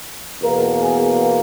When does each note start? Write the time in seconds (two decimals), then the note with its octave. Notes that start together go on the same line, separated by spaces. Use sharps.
0.41 E2 B2 A#3 A#4
0.80 G#4